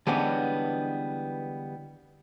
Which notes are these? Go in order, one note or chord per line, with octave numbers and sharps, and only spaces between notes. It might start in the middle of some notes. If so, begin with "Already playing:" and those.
D3 E3 G3 G#3 B3 C#4